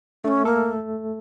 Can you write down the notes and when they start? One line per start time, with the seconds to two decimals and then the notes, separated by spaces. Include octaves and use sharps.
0.24 A3 C#4 D4
0.45 A#3 A4